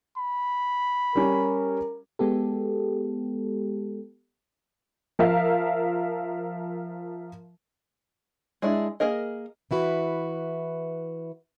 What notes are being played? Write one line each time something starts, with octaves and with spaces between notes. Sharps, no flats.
B5
G3 C#4 A#4
G#3 B3 G4 A4
F3 A#4 E5 F5
G#3 D4 E4
A#3 G#4 A#4 D#5
E3 E4 F#4 B4